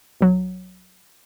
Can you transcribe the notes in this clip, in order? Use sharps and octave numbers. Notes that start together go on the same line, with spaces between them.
B1 F#3